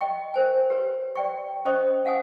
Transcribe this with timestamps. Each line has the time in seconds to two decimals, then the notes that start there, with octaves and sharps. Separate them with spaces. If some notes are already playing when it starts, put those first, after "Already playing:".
0.01 D#5 G5 C#6
0.34 A#4 C5 G#5
0.70 G4 B4 C#5
1.16 D5 G5 C#6
1.65 C#4 C5 D#5 C#6 D#6
2.05 C#4 F5 F#5 G#5 D#6